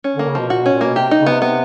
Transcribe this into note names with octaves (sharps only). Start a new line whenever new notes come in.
C#4
D3 A#3
C#3
B2 F3
A#2 F#4
B2 C#4
A#2
B2 A#3
C3 G4
D#4
C#3
C3 B3
B3